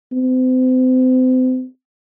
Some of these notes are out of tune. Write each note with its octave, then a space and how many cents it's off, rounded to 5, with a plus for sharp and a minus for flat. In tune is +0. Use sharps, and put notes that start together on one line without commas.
C4 -35